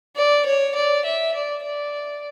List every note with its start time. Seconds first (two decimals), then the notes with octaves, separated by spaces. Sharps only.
0.16 D5
0.46 C#5
0.75 D5
1.05 E5
1.34 D5
1.64 D5